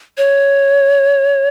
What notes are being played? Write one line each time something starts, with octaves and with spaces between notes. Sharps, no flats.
C#5